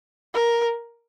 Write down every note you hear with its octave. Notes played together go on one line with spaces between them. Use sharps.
A#4